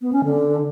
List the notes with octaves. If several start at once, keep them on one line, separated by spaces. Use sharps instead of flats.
B3
C#4
D3